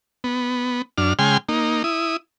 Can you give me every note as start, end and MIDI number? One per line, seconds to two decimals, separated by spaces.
0.24 0.82 59
0.98 1.13 42
0.98 1.13 62
0.98 1.13 89
1.19 1.37 49
1.19 1.37 56
1.19 1.37 79
1.19 1.37 80
1.19 1.37 84
1.19 1.37 89
1.49 1.83 58
1.49 1.83 63
1.84 2.17 64
1.84 2.17 87